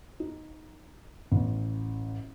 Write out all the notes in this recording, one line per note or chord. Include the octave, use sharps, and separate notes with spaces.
D#4
A1